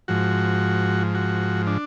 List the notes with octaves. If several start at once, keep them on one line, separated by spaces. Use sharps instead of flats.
G#2 F3 F#4
F#4
D4